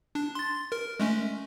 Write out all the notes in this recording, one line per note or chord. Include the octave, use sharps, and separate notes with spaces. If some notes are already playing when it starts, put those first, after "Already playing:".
D4
C6 A6
A#4
G#3 A3 C#4